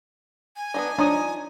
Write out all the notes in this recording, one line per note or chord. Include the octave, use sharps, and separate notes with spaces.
G#5
B3 D4 D#4
F3 D4 D#4 C#5 D#6